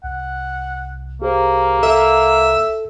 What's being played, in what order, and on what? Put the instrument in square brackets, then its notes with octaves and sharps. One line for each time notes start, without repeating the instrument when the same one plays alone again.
[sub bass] C2 [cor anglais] F#5
[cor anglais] A#3 [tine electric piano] G4 G#4 C5
[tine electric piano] A4 [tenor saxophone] E5